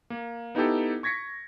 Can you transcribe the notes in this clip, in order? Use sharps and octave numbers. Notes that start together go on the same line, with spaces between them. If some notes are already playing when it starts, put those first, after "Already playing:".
A#3
B3 D#4 E4 G4 A4
C#6 G#6 A#6 B6 C#7